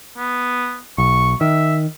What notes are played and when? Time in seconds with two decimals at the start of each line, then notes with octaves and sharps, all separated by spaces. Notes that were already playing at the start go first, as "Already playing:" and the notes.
0.18 B3
0.98 B1 C#6
1.41 D#3 E5